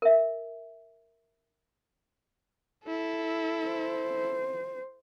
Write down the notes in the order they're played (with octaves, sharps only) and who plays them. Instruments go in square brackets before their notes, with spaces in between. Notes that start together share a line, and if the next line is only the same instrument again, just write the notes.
[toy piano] A#4 E5
[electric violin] E4 A4
[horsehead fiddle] C5